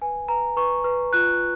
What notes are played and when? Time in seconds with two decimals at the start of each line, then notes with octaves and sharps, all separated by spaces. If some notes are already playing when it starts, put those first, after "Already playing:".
0.02 B4 G#5
0.29 B4 A#5
0.57 B4 C#6
0.84 B4
1.13 F4 F#6